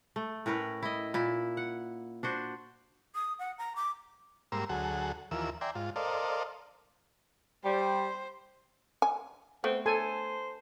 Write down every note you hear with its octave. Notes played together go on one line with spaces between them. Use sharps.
A3
A2 C#4 A#4 B4
E4 D#5
A#2 E4
F#5
D4 F#4 C5
D#6
F#5
A#5
D6
G#2 G3 A#3 A#5 C6 E6
D2 F#3 G#4 A4 F#5
D#2 E3 F3 A#4 E6
D5 E5 G5 G#5 A#5 C6
G#2 F4
A4 A#4 C5 D5 D#5 F5
G3 C5 G5
G#5
A3 B3 C4
A4 C5 G#5